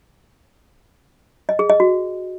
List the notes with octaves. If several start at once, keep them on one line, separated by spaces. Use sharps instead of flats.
D#5
G#4
D#5
F#4